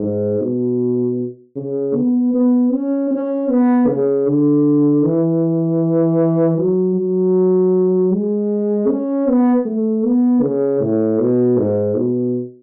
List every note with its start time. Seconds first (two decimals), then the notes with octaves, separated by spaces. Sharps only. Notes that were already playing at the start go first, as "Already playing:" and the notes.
Already playing: G#2
0.40 B2
1.56 C#3
1.95 B3
2.34 B3
2.72 C#4
3.11 C#4
3.49 B3
3.87 C#3
4.26 D3
5.03 E3
6.58 F#3
6.95 F#3
8.11 G#3
8.88 C#4
9.27 B3
9.65 A3
10.04 B3
10.42 C#3
10.80 A2
11.19 B2
11.57 G#2
11.96 B2